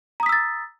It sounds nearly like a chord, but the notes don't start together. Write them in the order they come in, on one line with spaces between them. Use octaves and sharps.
A#5 D#6 B6 E6 A6